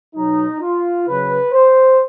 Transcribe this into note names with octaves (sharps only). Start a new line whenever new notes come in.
B2 F#3 D#4
F4
C#3 F#3 B4
C5